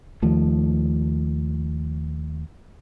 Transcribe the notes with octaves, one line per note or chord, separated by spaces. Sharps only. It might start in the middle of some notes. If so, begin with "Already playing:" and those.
D#2 D#3 F3 A3